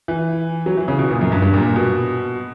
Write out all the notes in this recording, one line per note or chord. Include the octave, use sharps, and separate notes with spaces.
E3
F#3
E3
C#3
B2
A#2
F#2
G2
G2
A#2
B2